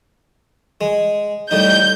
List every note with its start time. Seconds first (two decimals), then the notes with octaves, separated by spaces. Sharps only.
0.81 G#3
1.51 A2 G3 D#4 G6